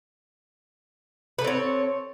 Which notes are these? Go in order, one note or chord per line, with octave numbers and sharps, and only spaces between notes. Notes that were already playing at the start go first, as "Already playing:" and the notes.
C4 A4 B4 C#5